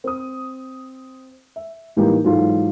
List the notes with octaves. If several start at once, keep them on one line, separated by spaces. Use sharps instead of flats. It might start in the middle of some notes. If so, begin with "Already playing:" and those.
C4 D#6
E5
A2 E3 G3 A#3 D#4 G4
G#2 E3 F#3 G#3 F4 A4